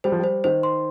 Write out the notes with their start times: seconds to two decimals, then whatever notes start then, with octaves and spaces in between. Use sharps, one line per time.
0.04 G3 C5
0.12 F3
0.19 G3 C5
0.44 D#3 C5
0.63 C6